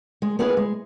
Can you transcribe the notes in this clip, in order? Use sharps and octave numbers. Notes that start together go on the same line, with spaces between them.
G#3
B3 E4 G#4 B4
G#3